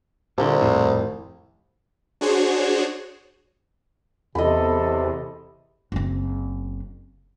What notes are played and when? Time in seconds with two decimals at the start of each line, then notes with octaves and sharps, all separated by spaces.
0.38 C2 A#2 D3
0.61 D#1 F2 A2
2.21 D4 F#4 G#4 C5 C#5
4.35 E2 C3 A4 D#5 B5
5.92 F#1 C4